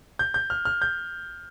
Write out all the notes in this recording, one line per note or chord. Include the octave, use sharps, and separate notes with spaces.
G6
G6
F6
F6
G6